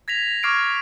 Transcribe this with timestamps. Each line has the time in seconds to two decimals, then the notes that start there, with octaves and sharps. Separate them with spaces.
0.08 G#6 A#6 B6 F7
0.43 C#6 D6 F6 G#6 C7 D7